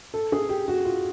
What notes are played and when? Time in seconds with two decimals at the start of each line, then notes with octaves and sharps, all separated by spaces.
0.14 A4
0.32 G#4
0.49 G4
0.68 F#4
0.85 F4